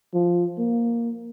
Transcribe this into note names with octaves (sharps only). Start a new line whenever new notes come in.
F3
A#3